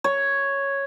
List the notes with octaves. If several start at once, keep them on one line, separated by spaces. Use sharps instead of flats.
C#5